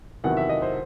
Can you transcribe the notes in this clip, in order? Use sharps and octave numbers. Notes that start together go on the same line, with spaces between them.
E2 C3 D#3 F#3 F#5
E5
D#5
C5